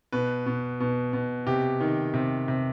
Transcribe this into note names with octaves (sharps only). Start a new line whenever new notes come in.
B2 B4
B2
B2
B2
C3 G4
D#3
C3
C3